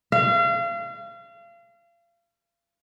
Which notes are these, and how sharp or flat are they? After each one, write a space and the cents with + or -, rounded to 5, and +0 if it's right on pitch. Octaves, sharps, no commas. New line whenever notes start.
F5 -35